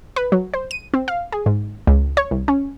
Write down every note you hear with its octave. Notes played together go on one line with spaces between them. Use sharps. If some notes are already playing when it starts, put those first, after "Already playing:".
B4
F#3
C5
D#7
C4
F5
G#4
G#2
C#2
C#5
C2
C#4